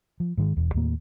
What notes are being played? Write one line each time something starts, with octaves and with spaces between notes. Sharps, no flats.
F3
G#2 D#3 G#3
E1 E2
D#2 A2 A#3